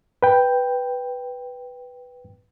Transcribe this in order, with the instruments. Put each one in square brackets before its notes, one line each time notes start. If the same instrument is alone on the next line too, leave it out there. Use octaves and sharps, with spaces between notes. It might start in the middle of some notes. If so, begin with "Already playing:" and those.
[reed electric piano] B4 G5